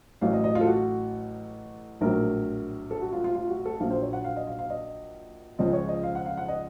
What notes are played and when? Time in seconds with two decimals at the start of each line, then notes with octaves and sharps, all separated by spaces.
0.21 A1 A2 F#3 F5
0.33 D#5
0.44 D#5
0.55 F4
0.61 A4
0.67 F#4
2.01 A#1 A2 F#3 A#4
2.91 A4
3.01 F#4
3.13 F4
3.24 F4
3.35 F4
3.49 F#4
3.65 A4
3.80 A#1 A#2 F#3 F5
3.90 C5
4.02 C#5
4.13 F#5
4.24 F5
4.36 D#5
4.47 F5
4.59 F5
4.70 D#5
5.59 C#2 C#3 F3 D#5
5.73 C#5
5.88 D#5
6.03 F5
6.15 F#5
6.26 F5
6.37 F#5
6.48 D#5